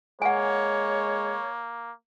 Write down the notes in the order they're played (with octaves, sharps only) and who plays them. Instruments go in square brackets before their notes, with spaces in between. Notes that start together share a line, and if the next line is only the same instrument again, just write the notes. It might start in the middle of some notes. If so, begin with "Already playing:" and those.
[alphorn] G#3 [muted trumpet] A#3 [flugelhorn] C#5 [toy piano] F#5 G#5